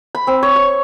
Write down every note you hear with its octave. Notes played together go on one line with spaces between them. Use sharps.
B5
C4
C#5
C#6